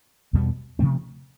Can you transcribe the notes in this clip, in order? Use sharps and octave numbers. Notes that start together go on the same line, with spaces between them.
E2 B2 G3 B3
C3 F3 A3 C4